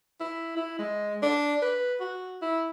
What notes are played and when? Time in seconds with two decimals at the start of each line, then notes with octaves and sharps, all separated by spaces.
0.20 E4
0.57 E4
0.79 G#3
1.22 D4
1.62 B4
2.00 F#4
2.42 E4